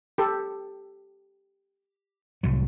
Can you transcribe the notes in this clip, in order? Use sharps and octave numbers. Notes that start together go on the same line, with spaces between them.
G4 A4
C2 A2 F#3